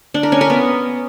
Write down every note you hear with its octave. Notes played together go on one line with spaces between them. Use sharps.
D4
A#4
C#4
A#4
B3